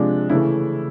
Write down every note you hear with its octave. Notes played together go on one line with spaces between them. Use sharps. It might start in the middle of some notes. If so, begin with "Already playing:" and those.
Already playing: C3 F3 G#3 D4
C#3 E3 A3 E4